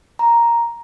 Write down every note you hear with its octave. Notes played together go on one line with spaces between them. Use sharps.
A#5